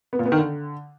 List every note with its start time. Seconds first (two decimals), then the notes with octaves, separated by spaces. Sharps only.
0.13 B3
0.19 A#2
0.25 B3
0.32 D#3
0.38 D3